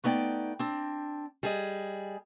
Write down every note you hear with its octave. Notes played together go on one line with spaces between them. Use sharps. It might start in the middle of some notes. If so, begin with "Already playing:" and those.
A3 B3 D#4 D5 G5
C4 D4
G3 G#4 D#5